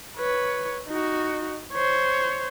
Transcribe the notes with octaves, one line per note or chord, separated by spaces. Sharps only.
B4 C#5
D#4 F#4
C5 C#5